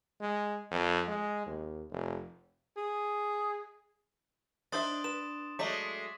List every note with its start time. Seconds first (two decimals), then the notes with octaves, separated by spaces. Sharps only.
0.21 G#3
0.71 F2
1.08 G#3
1.46 D#2
1.91 F1
2.77 G#4
4.72 D4 D#4 C5 E5 C6 D#6 A6
5.04 B4 E7
5.59 F#3 G#3 A3 D4 D#5 D6 B6